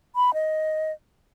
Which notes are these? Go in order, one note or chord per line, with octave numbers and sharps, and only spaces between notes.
B5
D#5